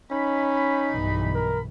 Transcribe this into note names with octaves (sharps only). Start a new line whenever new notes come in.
C#4 D#4 B5
B1 G2 E3
A#4